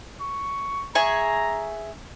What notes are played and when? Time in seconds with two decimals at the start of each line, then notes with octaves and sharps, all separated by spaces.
0.21 C#6
0.95 G#4 E5 A#5 C#6